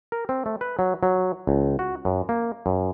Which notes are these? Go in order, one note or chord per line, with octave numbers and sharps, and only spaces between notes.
A#4
C4
A3
B4
F#3
F#3
C#2
F#4
F#2
A#3
F#2